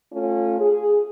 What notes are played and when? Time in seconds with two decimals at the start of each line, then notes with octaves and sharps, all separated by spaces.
0.13 A3 C#4 F4
0.60 G#4